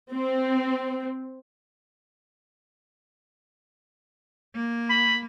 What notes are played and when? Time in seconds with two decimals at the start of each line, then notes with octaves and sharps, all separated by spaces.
0.11 C4
4.55 A#3
4.90 B5